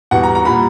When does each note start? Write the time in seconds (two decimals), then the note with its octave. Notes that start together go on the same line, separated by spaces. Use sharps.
0.11 E2 B2 G3 F#5
0.23 A#5
0.35 A#5
0.45 A#2 G3 B5